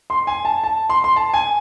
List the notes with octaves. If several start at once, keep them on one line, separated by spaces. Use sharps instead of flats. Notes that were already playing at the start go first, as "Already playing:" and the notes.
C6
G#5
A5
A5
C6
C6
A5
G#5